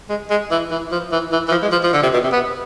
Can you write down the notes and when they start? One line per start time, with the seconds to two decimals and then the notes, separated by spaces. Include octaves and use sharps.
0.09 G#3
0.30 G#3
0.51 E3
0.71 E3
0.92 F3
1.12 E3
1.32 E3
1.48 E3
1.51 F3
1.63 G#3
1.72 F3
1.83 F3
1.93 D3
2.03 C3
2.13 B2
2.24 C3
2.33 B3